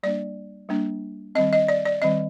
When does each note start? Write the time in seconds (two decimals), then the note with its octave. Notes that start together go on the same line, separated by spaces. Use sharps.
0.03 G3 A#3 D4 D5
0.69 G3 A#3 D4
1.35 D#3 G3 C4 D#5
1.53 D#5
1.68 D5
1.86 D5
2.02 D#3 G3 C4 D#5